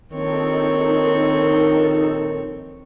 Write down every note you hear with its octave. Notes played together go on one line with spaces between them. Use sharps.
A#1 D#3 C4 D#4 A4 C#5